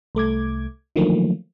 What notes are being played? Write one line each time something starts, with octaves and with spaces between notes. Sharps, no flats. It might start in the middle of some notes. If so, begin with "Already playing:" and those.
C2 A3 D6 G#6
D3 D#3 F3 F#3 A3 A#3